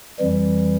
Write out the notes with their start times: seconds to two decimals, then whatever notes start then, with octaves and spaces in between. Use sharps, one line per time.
0.19 F2 E3 G3